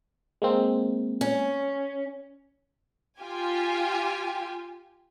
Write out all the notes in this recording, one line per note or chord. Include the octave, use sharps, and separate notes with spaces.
G#3 A#3 C4
C#4
F4 G4 G#5